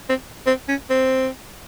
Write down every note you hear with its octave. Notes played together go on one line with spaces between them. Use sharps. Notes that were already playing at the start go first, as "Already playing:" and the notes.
C4
C4
C#4
C4